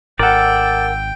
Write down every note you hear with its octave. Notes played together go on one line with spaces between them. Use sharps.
G#1 A4 A#4 D5 F#5 G5